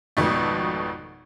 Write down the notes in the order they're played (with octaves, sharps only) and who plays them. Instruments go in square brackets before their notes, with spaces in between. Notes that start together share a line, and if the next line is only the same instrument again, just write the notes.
[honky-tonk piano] G#1 F2 B2 A3